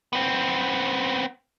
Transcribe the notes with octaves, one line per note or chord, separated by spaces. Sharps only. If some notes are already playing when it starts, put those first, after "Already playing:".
B3 C4